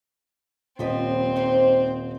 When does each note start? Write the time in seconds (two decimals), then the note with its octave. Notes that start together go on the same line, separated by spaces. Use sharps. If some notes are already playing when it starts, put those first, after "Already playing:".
0.79 D#1 F3 C4 B4 D#5
1.36 A#3 D#4 C5